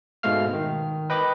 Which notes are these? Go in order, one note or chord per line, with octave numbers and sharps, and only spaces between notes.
G#2 B2 G#3 A3 F5 F6
D#3
B4 D#5 G5 B5 D6